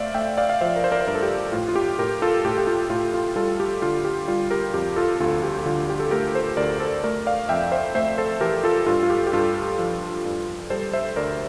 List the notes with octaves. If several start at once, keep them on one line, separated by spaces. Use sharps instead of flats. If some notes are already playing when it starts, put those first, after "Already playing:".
Already playing: A3 C5 D5 E5 F5
A3 E5 G5
D5 F5
F5
F3 C5 E5
A#4
C5
A#4 D5
C5
G2 A#4
A4
G4
A2 F4
F4
G4
A2 G4 A#4
F4 A4
A2 G4
G4
F4
A2 F4
F4
G3 F4 A4
G4
D3 F4
G4
G3 F4
G4 A#4
F2 G4
F4 A4
D2 F4 A4
G4
D3 F4
G4
A4
A3 G4 A#4
A4 C5
D2 A#4 D5
A4 C5
A3 A#4 D5
D5 F5
F2 E5 G5
C5 E5
A3 C5 E5
A4 C5
E3 G4 A#4
F4 A4
G2 F4 A4
F4
G4
G4
G2 F4 A4
F3
G2
G3 A4 C5
C5 E5
D2 A#4 D5